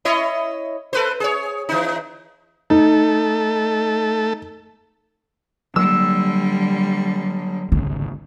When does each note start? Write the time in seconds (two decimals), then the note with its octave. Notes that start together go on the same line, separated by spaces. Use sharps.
0.05 E4 C#5 D#5
0.93 A4 B4 C5
1.20 G#4 C#5
1.69 E3 D#4
2.70 A3 D#4 A4
5.76 D3 F#3 G3 A#3 E6
7.72 G#1 D2 C#3